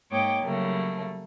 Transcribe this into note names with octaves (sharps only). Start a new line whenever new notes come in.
G#2 A#3 C#5 D#5 G5 D6
C#3 F#3 G3 A3 A#3